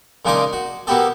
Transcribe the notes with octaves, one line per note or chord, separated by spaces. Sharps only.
A#2 C#3 G#3 D4 D#4 D6
F#4
A#3 B3 F#4 G4 A4